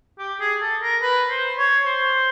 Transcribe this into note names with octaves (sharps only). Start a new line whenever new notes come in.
G4
G#4
A4
A#4
B4
C5
C#5
C5